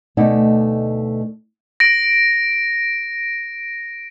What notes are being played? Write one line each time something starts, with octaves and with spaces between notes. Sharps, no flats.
D2 B2 A3 D#4 D5 F#5
A#6 D7